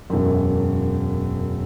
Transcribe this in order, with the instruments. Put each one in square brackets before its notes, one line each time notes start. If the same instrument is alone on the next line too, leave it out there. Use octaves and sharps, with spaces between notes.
[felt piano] E1 F#2